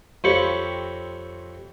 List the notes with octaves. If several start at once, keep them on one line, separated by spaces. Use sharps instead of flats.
F2 C4 G4 C#5 B5 C#6